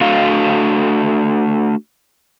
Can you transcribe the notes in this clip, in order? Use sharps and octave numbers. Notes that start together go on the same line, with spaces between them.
A3 D4 F#4 A4 F5